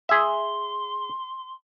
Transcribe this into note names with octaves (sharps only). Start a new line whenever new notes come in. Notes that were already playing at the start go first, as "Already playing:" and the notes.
G#4 E5 C6